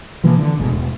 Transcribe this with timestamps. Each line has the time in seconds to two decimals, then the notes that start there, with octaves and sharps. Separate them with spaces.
0.24 B2 E3 F3 A#3
0.37 D3
0.58 G1 C2 G#2 B2
0.70 E1